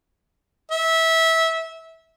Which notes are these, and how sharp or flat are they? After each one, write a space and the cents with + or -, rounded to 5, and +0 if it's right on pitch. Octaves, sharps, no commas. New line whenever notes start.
E5 -20